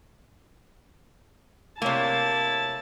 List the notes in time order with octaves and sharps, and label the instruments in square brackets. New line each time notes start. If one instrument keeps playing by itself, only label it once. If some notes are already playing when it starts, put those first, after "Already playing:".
[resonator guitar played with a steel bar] C3 A#3 [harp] A3 C#5 [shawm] E4 [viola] A5